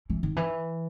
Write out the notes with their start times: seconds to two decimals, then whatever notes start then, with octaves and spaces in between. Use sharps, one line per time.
0.10 E3
0.23 D#3
0.36 E3